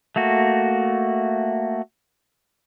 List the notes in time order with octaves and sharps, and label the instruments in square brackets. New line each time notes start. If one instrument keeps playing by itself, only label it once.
[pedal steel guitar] A3 A#3 F#4